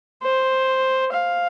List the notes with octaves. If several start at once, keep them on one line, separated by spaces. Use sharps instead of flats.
C5
F5